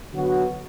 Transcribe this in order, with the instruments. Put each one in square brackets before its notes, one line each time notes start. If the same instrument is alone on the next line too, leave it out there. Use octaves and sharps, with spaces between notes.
[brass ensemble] D3 F#3 B3 F#4